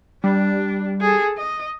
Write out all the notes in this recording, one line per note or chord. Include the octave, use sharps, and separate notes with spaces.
G3 D4
G#4 A4
D#5